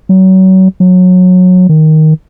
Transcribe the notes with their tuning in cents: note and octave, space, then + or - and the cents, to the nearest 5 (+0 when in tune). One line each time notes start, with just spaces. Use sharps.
F#3 +30
F#3 -20
D#3 +5